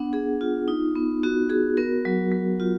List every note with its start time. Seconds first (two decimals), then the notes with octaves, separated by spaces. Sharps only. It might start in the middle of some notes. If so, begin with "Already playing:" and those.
Already playing: B3 D4 F#5
0.13 B3 G#4
0.41 F4
0.68 D#4
0.95 B3
1.23 B3 F#4
1.50 F#4 G#4
1.77 B3 A#4
2.05 F#3
2.31 F#3
2.60 F4